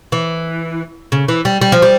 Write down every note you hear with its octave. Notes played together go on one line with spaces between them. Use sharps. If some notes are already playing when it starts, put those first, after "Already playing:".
E3
C#3
E3
G3
G3
F3
G3